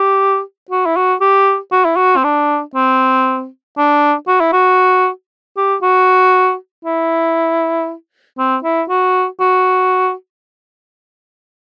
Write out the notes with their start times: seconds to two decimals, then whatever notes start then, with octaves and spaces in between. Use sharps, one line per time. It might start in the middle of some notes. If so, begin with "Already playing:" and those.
Already playing: G4
0.71 F#4
0.86 E4
0.96 F#4
1.21 G4
1.72 F#4
1.85 E4
1.96 F#4
2.17 C4
2.24 D4
2.75 C4
3.78 D4
4.28 F#4
4.40 E4
4.53 F#4
5.57 G4
5.82 F#4
6.85 E4
8.38 C4
8.64 E4
8.89 F#4
9.40 F#4